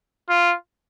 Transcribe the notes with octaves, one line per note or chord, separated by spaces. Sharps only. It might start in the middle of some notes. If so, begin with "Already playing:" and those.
F4